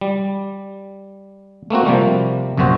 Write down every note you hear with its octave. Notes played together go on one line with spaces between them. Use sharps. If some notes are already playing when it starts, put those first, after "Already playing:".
G3
A3 A#3 C4 F#4
C3 F3 G3 A#3
A#1 F#2 C3 F#4 C5